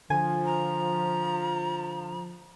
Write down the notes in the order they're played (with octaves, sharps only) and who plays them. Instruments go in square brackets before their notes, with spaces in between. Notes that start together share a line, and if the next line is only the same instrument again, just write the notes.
[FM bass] D3 [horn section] F3 [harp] G#5
[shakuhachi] A#5